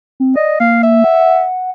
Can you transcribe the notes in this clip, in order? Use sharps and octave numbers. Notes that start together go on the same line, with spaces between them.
C4
D5 D#5
A#3 F5
E5
F#5